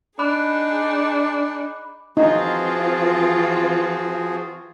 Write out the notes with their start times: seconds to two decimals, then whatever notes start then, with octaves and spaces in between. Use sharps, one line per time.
0.19 D4 D#4 G#4 B5 D6 F#6
2.17 E3 F3 C4 D#4 F4 F#4 G#4